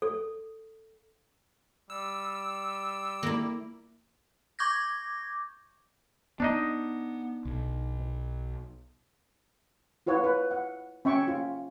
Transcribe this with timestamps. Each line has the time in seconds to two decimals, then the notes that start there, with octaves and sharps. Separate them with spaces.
0.02 A4
1.90 G3 E6
3.23 A#3 E4
4.59 C#6 D6 G6 G#6 A#6
6.40 B3 D4 D#4 D#5
7.45 B1
10.06 E4 F4 B4 C#5 F#5
10.24 B4
10.51 F#5
11.05 C#4 E5 G5 C#6
11.28 F4